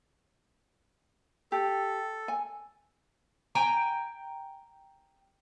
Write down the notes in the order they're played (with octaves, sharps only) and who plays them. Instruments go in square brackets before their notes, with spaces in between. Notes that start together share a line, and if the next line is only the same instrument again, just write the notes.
[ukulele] G4 [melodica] A4
[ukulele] G#5
[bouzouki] G5 G#5 A#5